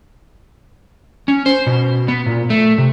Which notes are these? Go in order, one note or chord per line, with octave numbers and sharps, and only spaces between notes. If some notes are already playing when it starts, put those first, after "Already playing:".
C#4
C5
B2
B3
A#2
A3
C3